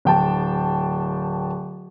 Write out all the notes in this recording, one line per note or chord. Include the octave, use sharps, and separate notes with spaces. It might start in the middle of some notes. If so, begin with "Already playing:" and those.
D1 G5 A5